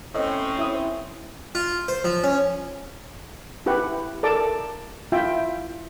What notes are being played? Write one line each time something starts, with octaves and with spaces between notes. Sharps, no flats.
A2 C4 C#4 D#5
E4 D#6
F4
C5
F3
C#4
E4 G4 B4 F#5
A4 A#4 D5 A5 D6
E4 F4 E5 G5